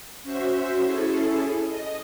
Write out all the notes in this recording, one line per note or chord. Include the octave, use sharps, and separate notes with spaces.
C#4 F#4 C5 E5
C#4 E4 G#4 A4
D#5